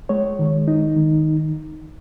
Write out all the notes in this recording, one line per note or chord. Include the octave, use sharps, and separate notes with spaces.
G#3 C#5
D#3
D#4
D#3